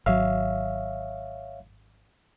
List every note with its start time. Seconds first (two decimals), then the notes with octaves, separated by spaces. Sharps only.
0.06 G#1 F#3 C#5 E5 F5